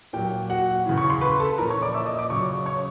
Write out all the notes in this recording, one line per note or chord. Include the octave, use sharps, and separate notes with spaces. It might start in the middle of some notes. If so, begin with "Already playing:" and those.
A#2 F#3 G4 G5
F#4 F#5
C#3 E3
C#6
C6
B4 B5
A4 A5
A#2 F3 A#4 A#5
C#5 C#6
D5 D6
E5 E6
D#5 D#6
D5 D6
C#3 F#3 C#5 C#6
C#5 C#6